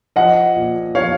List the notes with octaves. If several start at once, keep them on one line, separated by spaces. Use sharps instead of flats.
F3 D#5 F#5
A#2
F3 C#5 F5